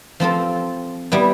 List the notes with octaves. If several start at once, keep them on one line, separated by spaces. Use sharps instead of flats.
F3 C4 F4 A4
G3 B3 E4